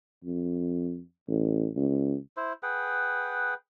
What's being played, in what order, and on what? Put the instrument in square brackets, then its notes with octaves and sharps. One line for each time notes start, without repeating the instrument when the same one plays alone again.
[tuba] F2
A1
C#2
[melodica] E4 C5
G#4 B4 F#5 G5